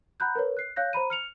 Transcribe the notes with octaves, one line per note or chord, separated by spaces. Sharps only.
F#5 A#5 B5 F#6 G6
A#4 B4 C#5
F#6 C7
C#5 F5 F#6 G6 A#6
C5 A#5 B5 D#7
F6 C#7 F7